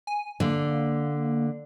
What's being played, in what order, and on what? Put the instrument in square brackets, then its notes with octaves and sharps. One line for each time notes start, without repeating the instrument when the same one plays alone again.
[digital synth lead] G#5
[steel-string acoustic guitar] D3 [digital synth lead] A#3